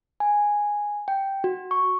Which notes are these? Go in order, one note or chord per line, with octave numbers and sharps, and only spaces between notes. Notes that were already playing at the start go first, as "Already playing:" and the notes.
G#5
G5
F#4
C#6